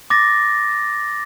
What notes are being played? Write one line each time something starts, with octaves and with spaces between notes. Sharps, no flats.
D6 A6 A#6